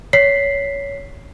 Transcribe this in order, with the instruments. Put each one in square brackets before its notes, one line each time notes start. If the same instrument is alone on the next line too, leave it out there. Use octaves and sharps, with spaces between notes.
[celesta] C#5 B6 C7